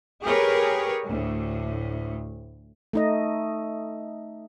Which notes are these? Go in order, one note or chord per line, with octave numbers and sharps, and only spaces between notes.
G4 G#4 A#4 B4 C#5
D2 A2
A3 D#4 D#5